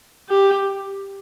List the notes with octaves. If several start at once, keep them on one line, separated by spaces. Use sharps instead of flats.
G4